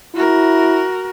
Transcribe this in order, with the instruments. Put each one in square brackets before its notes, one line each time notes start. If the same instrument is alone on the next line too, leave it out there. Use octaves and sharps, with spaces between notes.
[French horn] E4 [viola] F#4 A#4